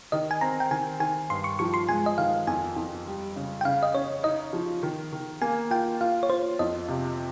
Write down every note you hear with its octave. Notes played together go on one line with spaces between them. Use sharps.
D#3 D#5
G#5
C4 A#5
G5
D#3 G#5
D#3 G#5
G2 C6
C#6
F3 C#6
C6
G#3 G#5
D#5
D#3 F5
F2 G#5
F2
G3
C#3
G5
C#3 F5
D#5
C#4 C#5
D#4 D#5
F3
D#3
D#3
A#3 G#5
F4 G5
F4 F5
C#5
F4 C5
F2 D#5
C3